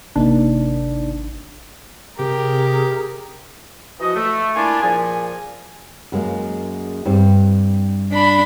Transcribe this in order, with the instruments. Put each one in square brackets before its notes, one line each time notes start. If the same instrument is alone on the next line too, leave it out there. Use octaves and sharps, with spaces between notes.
[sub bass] G#1 [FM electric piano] C3 A#3 D#4 [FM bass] D4
[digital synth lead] C3 [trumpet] G4 [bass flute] G#4 [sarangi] A#4
[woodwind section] E3 F3 F#4 D#5
A3
A#3 D4 E4 F4 D5 G#5
A#2 F3 G#4 G#5
[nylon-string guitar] F#2 G#3 A#3
G2 C4
[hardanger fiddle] D4 B5